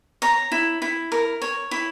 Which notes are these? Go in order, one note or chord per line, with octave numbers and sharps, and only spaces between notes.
C#5 A#5
E4
E4
A#4
C#5
E4